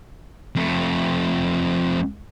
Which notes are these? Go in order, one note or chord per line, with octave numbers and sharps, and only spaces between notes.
F2 A3